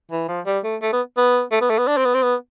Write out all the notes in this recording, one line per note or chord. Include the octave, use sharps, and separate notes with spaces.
E3
F3
G3
A3
A3
B3
B3
A3
B3
A3
B3
D4
C4
B3
C4
B3